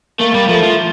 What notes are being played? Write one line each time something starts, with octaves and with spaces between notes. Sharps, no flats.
A3 A#3
G3
F3 A3
F3